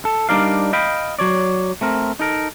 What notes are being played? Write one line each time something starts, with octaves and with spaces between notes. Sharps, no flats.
A4
G3 D4 D#4 A#4 D5 F5
D#5 F5 G5 B5
F#3 C#5 D5
A3 C4 A#4
D#4 A4 A#4